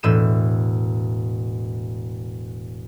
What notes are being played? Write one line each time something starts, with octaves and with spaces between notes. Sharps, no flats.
E1 A2 E6 D#7 E7